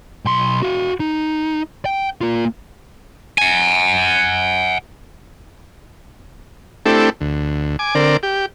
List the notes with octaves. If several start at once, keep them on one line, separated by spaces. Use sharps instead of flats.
B1 C6
F#4 F5
D#4
G5
A#3 F4
F#5 G#5
A3 C4 D4 E4 G4 A4
D2
G#5 D6
D3 C4 A#4 D5
G4